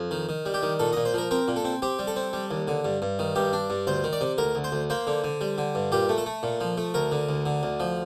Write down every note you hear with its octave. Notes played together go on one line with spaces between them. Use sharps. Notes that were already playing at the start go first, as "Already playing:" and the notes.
Already playing: F2
D#3
D#3
G3
G4
D#3
A#2 A4
D#5
A#2
C5
F3 A#4
C4 A#4
A#2
A4
C4
C4 G4
G3
A4
C4
G3
D#2
D3
G2
G2
D#3
G2 G4
D4
G2
D2 C5
D#3
D5
C3
D2 A#4
D2
C5
D2
A#3 C5
D3
D3
G3
D3
G2
A#2 G4
A3
A4
A3
A#2
F3
A3
D2 A#4
D3
D2
D3
D2
F3